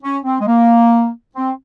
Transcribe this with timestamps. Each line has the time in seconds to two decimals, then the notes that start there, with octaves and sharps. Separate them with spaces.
0.02 C#4
0.24 C4
0.40 G#3
0.47 A#3
1.36 C4